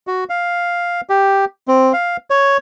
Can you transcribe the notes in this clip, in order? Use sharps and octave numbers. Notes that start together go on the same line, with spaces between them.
F#4
F5
G4
C4
F5
C#5